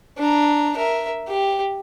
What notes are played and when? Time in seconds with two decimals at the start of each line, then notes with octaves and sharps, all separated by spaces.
0.18 D4 A#5
0.77 A#4 E5
1.28 G4